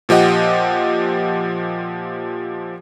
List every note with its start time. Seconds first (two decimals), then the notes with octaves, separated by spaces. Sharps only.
0.09 A#2 F3 G4 D#5 F#5